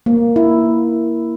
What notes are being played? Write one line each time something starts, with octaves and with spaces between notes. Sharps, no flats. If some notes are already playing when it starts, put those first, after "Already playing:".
A#3
E4